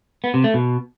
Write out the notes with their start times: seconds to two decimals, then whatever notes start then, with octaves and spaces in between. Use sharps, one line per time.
0.24 B3
0.34 C3
0.44 A3
0.54 B2